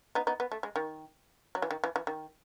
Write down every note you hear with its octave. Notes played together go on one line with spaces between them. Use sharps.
B3 D#4
B3 D#4
B3
A3
G#3
D#3
F#3
E3
D#3
E3
E3
D#3